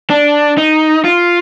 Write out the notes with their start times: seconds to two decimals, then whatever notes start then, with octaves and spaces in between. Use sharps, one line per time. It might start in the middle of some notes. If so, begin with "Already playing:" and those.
0.10 D4
0.58 D#4
1.05 F4